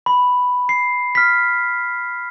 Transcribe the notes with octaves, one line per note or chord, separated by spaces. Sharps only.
B5
C7
F6 B6